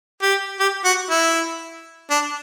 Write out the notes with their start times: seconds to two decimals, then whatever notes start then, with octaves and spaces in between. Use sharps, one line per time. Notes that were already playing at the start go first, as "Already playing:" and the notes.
0.22 G4
0.59 G4
0.84 F#4
1.10 E4
2.10 D4